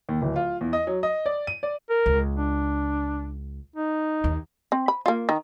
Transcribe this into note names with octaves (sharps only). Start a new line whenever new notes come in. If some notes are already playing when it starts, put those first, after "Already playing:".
D#2
D1
F4
E2
D#5
F#3
D#5
D5
D#7
D5
A#4
C#2
D4
D#4
D#2
C4
B5
A#3 F4
D#3